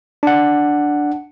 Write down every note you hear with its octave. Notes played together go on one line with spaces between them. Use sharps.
D4 F#5